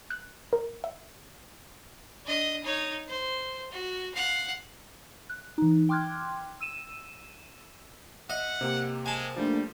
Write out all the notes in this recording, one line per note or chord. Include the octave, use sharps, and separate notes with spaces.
F#6
A#4
E5
D4 D#5
D#4 C#5
C5
F#4
F5 F#5
F#6
E3 D#4
G5 C6 D6 F6 F#6 G#6
E6 D#7 E7
D#5 E5 F#5
C3 A#3 G4
G#3 G#5 A5
F3 G3 A3 A#3 D4